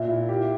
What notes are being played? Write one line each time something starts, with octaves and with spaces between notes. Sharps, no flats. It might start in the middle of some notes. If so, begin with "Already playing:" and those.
Already playing: A#2 E5
E4
G4